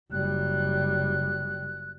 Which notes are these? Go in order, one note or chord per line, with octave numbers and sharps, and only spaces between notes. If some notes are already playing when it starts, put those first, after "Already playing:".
F#1 G3 F#6